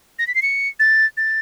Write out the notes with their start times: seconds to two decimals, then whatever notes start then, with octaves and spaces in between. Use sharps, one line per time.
0.19 A#6
0.28 B6
0.35 C7
0.42 C#7
0.80 A6
1.17 A6